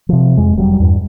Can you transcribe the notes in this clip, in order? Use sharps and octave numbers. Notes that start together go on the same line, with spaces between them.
C3 F3
F2 G#3
F1 F#3 G3
E2 G2